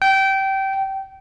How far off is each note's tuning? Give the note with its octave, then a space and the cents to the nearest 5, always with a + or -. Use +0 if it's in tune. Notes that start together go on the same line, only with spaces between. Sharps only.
G5 -20